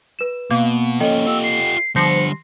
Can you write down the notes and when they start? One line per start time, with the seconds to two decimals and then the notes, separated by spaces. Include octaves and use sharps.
0.19 B4 E7
0.51 B2 A#3
1.00 F3 C#4 A4 D#5 G5
1.27 F4 G4 E6
1.44 C7
1.96 D3 F3 G3 C6 A#6 C7 C#7